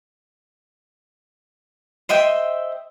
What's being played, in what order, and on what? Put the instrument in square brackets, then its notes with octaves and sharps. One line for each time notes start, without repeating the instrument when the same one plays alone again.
[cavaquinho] C5 D#5 E5 G5